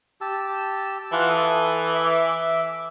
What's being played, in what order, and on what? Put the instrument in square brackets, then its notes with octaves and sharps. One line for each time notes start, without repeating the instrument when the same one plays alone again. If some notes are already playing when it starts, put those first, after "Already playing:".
[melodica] G4 A5 E6
[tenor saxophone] E3 [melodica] F4 F#5 A5
[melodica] A4 D#6
E5 D6